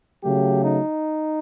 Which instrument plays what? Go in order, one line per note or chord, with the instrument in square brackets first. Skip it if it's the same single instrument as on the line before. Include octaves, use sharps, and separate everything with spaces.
[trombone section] C#3 F#3 A3 G4
D#4